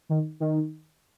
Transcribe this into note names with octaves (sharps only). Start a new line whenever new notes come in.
D#3
D#3